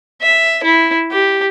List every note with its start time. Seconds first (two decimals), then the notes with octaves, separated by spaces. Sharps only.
0.22 E5
0.64 E4
1.12 G4